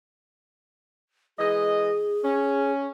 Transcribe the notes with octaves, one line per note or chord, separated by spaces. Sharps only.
E3 G#3 G#4 D#5
C#4